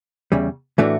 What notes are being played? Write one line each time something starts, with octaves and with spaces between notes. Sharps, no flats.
E2 C#3 G3
A2 E3 A3 D4 F#4